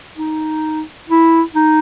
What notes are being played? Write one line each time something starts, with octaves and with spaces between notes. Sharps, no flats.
D#4
E4
D#4